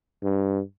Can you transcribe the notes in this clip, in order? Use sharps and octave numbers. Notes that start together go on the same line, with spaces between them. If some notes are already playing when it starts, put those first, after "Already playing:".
G2